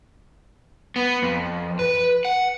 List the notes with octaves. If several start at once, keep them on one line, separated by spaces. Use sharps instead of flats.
B3
F2
B4
F#5